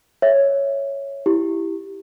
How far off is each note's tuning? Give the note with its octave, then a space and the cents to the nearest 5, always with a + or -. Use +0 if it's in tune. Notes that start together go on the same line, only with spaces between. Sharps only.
C#5 +0 E5 +0
E4 +0 G4 +0